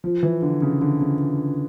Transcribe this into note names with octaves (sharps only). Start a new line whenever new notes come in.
F3
E3
D3
C#3
D3
C#3